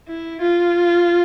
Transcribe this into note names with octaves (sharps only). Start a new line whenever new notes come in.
E4
F4